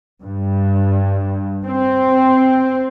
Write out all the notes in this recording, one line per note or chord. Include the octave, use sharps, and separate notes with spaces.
G2
C4